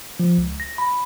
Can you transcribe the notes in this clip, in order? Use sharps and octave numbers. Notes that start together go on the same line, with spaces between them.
F3
C#2
A#6
B5